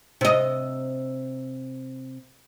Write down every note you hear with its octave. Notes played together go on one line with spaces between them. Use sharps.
C3 D#5